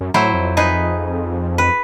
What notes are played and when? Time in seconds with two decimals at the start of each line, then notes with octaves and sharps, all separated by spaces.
0.01 F#2
0.14 A2 F#3 E4 C5
0.34 F2
0.57 D#4 G#4 B4
1.58 B4